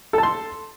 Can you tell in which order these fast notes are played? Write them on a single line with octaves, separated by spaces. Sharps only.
A4 A5 C6